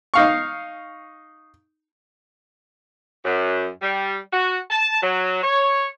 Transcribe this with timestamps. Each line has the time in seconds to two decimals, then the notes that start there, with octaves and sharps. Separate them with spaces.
0.14 D#4 F5 C#6
3.25 F#2
3.82 G3
4.32 F#4
4.71 A5
5.02 F#3
5.43 C#5